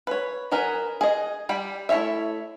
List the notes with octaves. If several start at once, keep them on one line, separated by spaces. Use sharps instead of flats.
B4 C#5
F#3 G#4 A#4 B4
G#4 D#5
G3 D5 G5 B5
A3 E4 G#4 C#5 E5